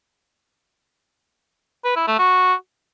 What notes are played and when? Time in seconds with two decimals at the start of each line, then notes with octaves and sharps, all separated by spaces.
1.85 B4
1.96 E4
2.07 A3
2.19 F#4